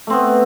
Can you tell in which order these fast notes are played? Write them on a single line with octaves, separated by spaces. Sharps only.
A3 C4 B3